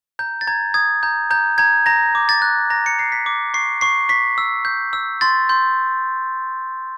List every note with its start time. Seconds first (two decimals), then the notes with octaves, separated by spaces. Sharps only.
0.19 A#5 G6
0.41 A6
0.48 A#5 G#6
0.74 D#6 G#6
1.03 A#5 G6
1.31 A#5 G6
1.58 A#5 G#6
1.86 A#5 A#6
2.15 D6
2.29 A6
2.42 F#6
2.70 A#5 A#6
2.86 C#7
2.98 A#5 C7
3.12 B6
3.26 D6
3.54 C#6 C7
3.81 C#6 C7
4.09 C#6 B6
4.38 E6
4.65 G6
4.93 E6
5.21 C6 A6
5.49 C6 G6